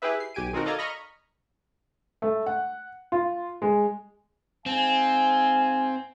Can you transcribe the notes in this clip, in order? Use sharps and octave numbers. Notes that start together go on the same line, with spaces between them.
E4 G4 G#4 B4 E5
C7
B1 G4 G#5 D7 D#7
D#3 C4 D#4 F#4 A#4
A4 D5 D#5 F5 A#5 G#6
D#5 A#5 B5 C#6 F6 A#6
A3
F#5
F4
G#3
G#2 C4 F5 G#5